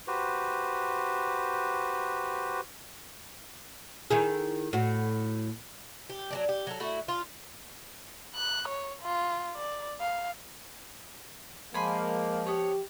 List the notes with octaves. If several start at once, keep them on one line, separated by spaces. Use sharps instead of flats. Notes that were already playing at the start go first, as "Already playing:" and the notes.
F#4 G4 B4 C5
D#3 E4 G#4
A2 F#4
G4
F#3 G3 D4
G4
F#3 A4
A3 E4 F#4
F4
F#6
C#5
F4
D5
F5
F3 G#3 A#3 G#5 B5 C6
B3 G4 C#5